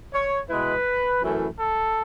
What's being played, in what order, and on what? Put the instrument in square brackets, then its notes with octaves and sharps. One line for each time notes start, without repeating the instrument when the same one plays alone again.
[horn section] C#5
B2 G#3 B3 E4 B4
F#2 E3 A3 C#4 E4
A4